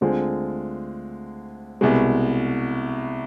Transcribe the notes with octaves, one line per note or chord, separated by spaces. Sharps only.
D2 D3 G#3 C4 F4
C2 B2 G#3